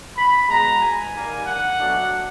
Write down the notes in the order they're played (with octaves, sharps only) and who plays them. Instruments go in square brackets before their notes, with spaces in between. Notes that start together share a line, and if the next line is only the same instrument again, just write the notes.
[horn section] B5
B2 G#3 B3 A#5
G#5
D#3 G3 A#3
F#5
B2 F#3 A3 D4